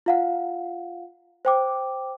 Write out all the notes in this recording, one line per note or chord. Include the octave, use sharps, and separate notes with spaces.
F4 F5 F#5
C5 G5 D6